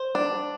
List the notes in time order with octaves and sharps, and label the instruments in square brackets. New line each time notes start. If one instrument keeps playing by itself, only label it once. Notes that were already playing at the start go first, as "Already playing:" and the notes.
Already playing: [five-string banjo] C5
D4